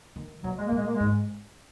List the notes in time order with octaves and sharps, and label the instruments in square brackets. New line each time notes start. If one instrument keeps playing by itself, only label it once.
[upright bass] D#3
[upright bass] B2 [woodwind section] F#3
[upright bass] G#2 [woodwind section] G#3
[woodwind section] A#3
[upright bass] A#2
[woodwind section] G#3
A#3
G#3
[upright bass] G#2